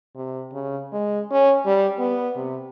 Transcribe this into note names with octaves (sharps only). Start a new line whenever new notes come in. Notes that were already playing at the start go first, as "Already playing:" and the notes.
C3
C#3
G#3
C#4
G3
B3
C3